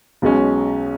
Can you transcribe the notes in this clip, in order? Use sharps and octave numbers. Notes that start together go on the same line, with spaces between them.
B1 B2 G#3 C#4